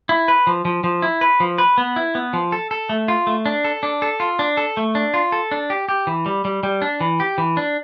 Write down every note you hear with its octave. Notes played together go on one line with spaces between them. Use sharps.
E4
B4
F3
F3
F3
E4
B4
F3
B4
B3
E4
B3
F3
A4
A4
A3
F4
A3
D4
A4
D4
A4
F4
D4
A4
A3
D4
F4
A4
D4
G4
G4
E3
G3
G3
G3
D4
E3
G4
E3
D4